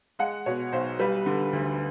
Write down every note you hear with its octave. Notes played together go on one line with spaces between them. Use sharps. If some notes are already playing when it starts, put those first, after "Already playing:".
G#3 F#5
B2 C#5
B1 C5
G3 B4
D3
D2